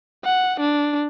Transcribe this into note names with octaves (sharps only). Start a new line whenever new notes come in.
F#5
D4